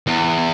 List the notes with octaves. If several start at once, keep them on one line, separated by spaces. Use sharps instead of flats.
E2